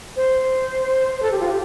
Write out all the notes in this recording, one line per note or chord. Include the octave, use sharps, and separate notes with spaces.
C5
C5
A4
G4
F4
G4